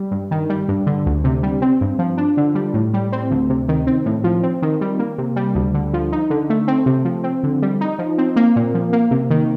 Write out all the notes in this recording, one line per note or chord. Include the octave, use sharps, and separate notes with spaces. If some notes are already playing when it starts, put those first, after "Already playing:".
Already playing: G3
G2
D#3
G3
G2
D3
D2
C3
G3
C4
G2
F3
D4
D3
G3
A2
G3
C4
D2
C3
D#3
C4
A2
F3
C4
D#3
G3
A#3
C3
G3
D2
D3
F3
D#4
D3
A3
C4
C3
F3
C4
D3
G3
D#4
F3
C4
A#3
A#2
F3
A#3
C3
D#3